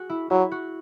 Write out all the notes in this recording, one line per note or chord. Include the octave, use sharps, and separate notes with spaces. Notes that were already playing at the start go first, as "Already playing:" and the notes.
Already playing: F#4 G#4
E4
F#3 E4
F#4